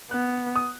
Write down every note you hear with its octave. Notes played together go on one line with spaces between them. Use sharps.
B3 F#6
D#6